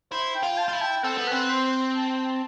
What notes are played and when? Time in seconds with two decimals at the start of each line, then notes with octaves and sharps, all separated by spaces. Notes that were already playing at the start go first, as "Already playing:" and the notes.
0.12 E4 C5
0.35 G5
0.43 F4
0.58 A5
0.68 F4
0.73 E4
0.82 G5
1.04 C4 A4
1.18 B3
1.27 C4 B4
1.50 C5
1.96 A5